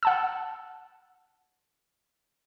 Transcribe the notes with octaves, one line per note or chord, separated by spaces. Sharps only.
F#5 A5 E6